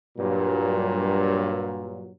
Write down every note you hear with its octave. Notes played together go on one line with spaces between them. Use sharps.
G2 A#2 F#3